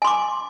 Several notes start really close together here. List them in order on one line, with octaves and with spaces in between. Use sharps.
G#5 C6 D6